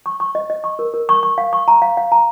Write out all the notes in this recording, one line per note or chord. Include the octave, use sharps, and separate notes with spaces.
C#6
C#6
D#5
D#5
C#6
A#4
A#4
C#6
C#6
F5
C#6
A#5
F5
F5
A#5